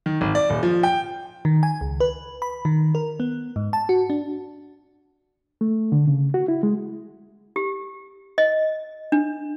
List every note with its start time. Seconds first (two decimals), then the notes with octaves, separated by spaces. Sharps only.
0.06 D#3
0.21 G#1
0.35 D5
0.50 D#1
0.63 F3
0.83 G5
1.45 D#3
1.63 G#5
1.81 C#2
2.00 B4
2.42 B5
2.65 D#3
2.95 A#4
3.20 B3
3.56 G#2
3.73 A5
3.89 F#4
4.10 D4
5.61 A3
5.92 D3
6.07 C#3
6.34 F#4
6.48 E4
6.63 G#3
7.56 G4
8.38 D#5
9.12 D4